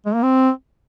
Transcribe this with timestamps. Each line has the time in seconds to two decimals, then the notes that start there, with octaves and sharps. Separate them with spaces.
0.06 G#3
0.14 A#3
0.23 C4